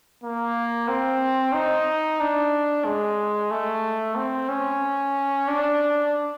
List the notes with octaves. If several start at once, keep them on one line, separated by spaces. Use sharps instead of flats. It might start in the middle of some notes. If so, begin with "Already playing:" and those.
A#3
C4
D#4
D4
G#3
A3
C4
C#4
D4